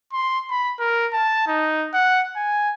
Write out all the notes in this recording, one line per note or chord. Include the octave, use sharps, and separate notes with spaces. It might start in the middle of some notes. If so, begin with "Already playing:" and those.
C6
B5
A#4
A5
D#4
F#5
G#5